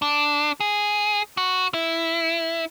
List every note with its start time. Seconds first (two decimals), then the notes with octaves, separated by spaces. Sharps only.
0.02 D4
0.60 G#4
1.37 F#4
1.74 E4